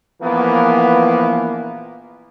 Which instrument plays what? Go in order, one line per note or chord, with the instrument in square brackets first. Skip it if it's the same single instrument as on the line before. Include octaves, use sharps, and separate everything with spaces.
[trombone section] A#1 E3 F3 A#3 B3 B4